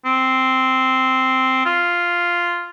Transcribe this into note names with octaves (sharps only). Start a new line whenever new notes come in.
C4
F4